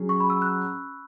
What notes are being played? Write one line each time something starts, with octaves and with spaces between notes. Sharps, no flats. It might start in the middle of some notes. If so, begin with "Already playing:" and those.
Already playing: F#3 C#4 G#4
C#6
B5
E6
F#6